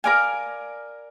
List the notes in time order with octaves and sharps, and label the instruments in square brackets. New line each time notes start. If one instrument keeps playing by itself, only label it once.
[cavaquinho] A#4 D5 F5 G#5